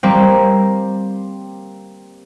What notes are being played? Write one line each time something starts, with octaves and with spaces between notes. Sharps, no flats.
G3 A#3 C4